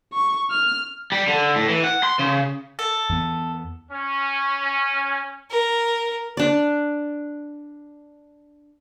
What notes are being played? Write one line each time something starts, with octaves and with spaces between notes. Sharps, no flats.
C#6
F6
G3
D3
A2
E3
F#5
C6
C#3
A4
E2 B3
C#4
A#4
D4 D5